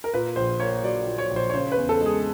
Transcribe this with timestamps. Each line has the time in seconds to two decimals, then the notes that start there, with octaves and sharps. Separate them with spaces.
0.04 A#4
0.14 A#2 B4
0.36 A#1 C5
0.60 A#3 C#5
0.83 F#3 D5
1.06 A#2
1.18 C#5
1.31 A#1
1.36 C5
1.50 C#5
1.54 C#3 C5
1.72 B4
1.78 E2
1.89 A4
2.01 G#3 G#4